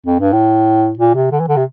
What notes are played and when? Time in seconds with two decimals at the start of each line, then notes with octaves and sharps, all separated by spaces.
0.06 F2
0.20 G2
0.33 A2
0.99 A#2
1.15 C3
1.31 D3
1.40 E3
1.48 D3
1.56 C3